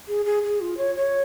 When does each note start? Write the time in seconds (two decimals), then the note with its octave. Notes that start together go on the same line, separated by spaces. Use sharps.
0.08 G#4
0.25 G#4
0.43 G#4
0.61 F4
0.77 C#5
0.95 C#5